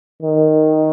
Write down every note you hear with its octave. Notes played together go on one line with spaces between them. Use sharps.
D#3